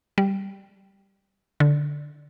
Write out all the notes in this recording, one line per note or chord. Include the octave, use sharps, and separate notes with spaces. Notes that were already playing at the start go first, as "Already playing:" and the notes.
G3
D3